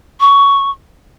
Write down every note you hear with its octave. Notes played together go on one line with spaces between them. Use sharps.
C#6